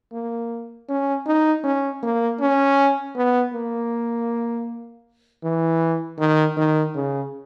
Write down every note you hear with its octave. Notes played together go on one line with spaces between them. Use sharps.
A#3
C#4
D#4
C#4
A#3
C#4
B3
A#3
E3
D#3
D#3
C#3